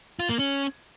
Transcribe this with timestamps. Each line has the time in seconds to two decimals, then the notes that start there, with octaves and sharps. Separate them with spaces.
0.19 F4
0.29 A#3
0.39 C#4